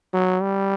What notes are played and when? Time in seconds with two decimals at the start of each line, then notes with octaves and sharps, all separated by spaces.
0.14 F#3
0.42 G3